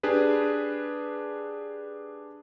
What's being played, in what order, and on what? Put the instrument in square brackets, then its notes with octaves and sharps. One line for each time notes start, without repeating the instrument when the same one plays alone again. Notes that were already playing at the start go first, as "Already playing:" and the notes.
[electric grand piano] D4 G4 G#4 B4